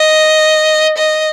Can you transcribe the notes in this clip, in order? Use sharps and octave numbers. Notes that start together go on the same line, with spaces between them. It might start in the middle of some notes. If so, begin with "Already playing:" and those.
Already playing: D#5
D#5